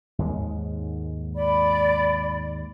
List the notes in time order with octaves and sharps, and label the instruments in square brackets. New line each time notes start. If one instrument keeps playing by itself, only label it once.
[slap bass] D#2 G#2 G#3
[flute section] D5 B5